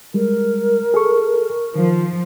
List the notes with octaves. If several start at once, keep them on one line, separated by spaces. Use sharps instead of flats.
G3 G#3 A#4
G#4 A4 C#6
D#3 F3